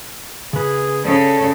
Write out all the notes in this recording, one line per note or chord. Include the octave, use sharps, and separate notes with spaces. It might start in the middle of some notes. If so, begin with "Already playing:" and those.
C#3 G#4 B4
C#3 A4 D5